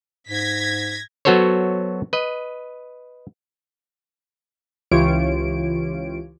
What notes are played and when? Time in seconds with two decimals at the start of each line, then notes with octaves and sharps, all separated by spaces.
0.29 G#2 G#6 A#6 B6
1.25 F#3 B3 F#4 A4 C5 C#5
2.13 B4 D#5
4.91 C#2 E3 F4 G4 C#5 D7